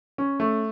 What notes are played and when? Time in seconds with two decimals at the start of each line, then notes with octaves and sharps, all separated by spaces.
0.18 C#4
0.40 A3